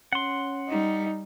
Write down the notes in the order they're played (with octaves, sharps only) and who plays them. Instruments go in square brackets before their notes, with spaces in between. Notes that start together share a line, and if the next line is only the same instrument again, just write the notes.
[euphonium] C#4 [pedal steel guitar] F#5 C6
[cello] G3 [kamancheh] D#4